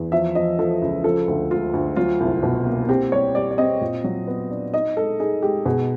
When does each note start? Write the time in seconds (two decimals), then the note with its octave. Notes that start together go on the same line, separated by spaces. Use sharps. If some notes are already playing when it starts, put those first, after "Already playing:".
Already playing: E2
0.12 F3 E5
0.35 F3 D#5
0.59 F3 A4
0.82 C#2
1.04 F3 A4
1.28 D2
1.50 G#3 F4
1.74 D2
1.96 F#3 F4
2.20 C2
2.43 B2
2.66 A#3
2.89 C4 G4
3.12 G3 C#5
3.35 G3 D5
3.51 D5
3.58 C4 D#5
3.81 A#2
4.04 F#3
4.27 B3
4.50 D4
4.74 D#4 D#5
4.97 G#3 A4
5.20 D#4 G#4
5.42 G#3 G4
5.66 B2 G#4